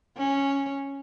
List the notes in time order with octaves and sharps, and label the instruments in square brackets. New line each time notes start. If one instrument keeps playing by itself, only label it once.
[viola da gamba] C#4